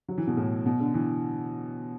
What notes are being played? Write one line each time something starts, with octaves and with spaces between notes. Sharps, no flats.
F#3
E3
B2
A2
B2
D3
E3